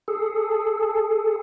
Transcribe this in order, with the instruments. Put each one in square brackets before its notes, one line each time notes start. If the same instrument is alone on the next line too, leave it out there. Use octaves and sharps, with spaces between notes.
[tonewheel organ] G#4 A4